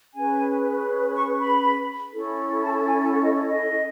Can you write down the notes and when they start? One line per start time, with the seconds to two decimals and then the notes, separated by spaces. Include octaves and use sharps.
0.14 C#4 G#4 B4 G#5
1.14 C#6
1.39 B5
2.13 C#4 E4 A4
2.62 A5
2.86 G#5
3.11 F#5
3.23 D#5
3.36 C#5
3.48 D#5